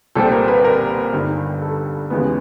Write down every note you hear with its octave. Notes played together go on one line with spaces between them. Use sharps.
C2 A#2 G3 C4 A4
A#4
B4
A#4
G1 G2 D#3
A4
D#2 C#3 E3 G#3 B3